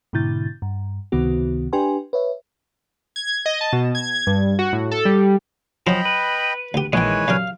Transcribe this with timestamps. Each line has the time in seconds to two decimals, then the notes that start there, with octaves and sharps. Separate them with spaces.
0.13 G#2 B2 D3 E4 G6 A6
0.62 G2
1.12 C#2 C3 D#3 B3 F#4
1.73 D4 G4 B4 G5 G#5 C6
2.13 B4 C#5 E5
3.16 G#6
3.46 D#5
3.61 A5
3.73 B2
3.95 G#6
4.27 G2
4.59 F#4
4.73 A2
4.91 A4
5.05 G3
5.87 F3 F#3 C#4 D#5 G5 B5
6.05 B4
6.74 D2 G4
6.93 A#1 D#3 E3 G#3 B4 C#5 G5 G#5
7.28 F#2 C3 D4 F5 F6